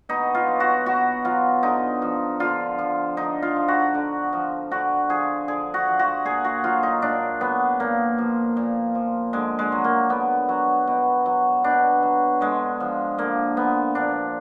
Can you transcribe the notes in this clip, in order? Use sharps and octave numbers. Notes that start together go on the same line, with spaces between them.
B2 D#4
F4
F#3
F#4
B2 F#4
F#3 F4
D3 D#4
F3
D3 F4
F3
D3 D#4
F4
F3
F#4
D3
F3
D3 F#4
F3 G#4
D3 G#4
F#4
F3
F#4
A#2 G#4
F#4
F#3 F4
D#4
A#2 D4
F#3 B3
A#2 A#3
F3
A#2
F3
D3 G#3
G#3
F#3
A#3
D3 B3
F#3
B2
F#3
B2 D4
F#3
D3 G#3
F3
D3 A#3
F3 B3
A#2 D4